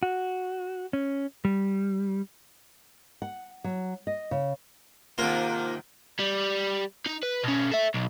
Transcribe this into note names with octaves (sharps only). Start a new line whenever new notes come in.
F#4
C#4
G3
F#5
F#3
D#5
C#3
G#2 C3 D#3 A#3 F4
G3
D#4
B4
B2 C#4
A4 E5
B1